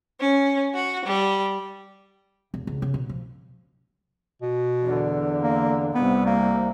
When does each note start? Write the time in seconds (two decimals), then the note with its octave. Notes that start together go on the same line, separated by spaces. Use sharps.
0.19 C#4
0.75 F#4
1.04 G3
2.54 E1
2.67 C#2
2.82 C#3
2.94 B2
3.09 F3
4.42 B2
4.82 E2 D3
5.42 A#3
5.94 C2 C3 B3
6.26 A#3